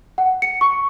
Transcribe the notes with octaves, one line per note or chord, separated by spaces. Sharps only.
F#5
C#7
C#6